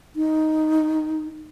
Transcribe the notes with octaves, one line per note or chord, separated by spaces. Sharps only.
D#4